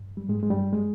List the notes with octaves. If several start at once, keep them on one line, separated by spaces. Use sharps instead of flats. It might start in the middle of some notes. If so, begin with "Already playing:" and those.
Already playing: G2
G3
G#2 G#3
G#3
G2 G3
G#3